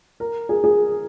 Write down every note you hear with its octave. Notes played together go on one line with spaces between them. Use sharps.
A#4
G#4
G#4